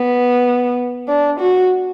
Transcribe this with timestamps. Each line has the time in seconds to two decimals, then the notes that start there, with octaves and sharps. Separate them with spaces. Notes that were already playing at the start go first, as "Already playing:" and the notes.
Already playing: B3
1.08 D4
1.40 F#4